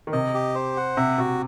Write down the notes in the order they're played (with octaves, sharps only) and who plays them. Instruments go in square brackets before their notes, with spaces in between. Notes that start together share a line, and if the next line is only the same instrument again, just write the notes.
[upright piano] D#3
[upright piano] C3 [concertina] D#5
[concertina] G4
C5
F#5
[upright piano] C3 [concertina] E5
[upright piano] C3 [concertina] F#4